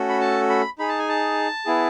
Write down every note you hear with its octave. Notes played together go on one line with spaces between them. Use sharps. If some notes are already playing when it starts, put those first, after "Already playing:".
Already playing: A3 C#4 F#4 A4
B5
A5
B5
D#4 G#4 B5
A5
G#5
A5
B3 E4 G#4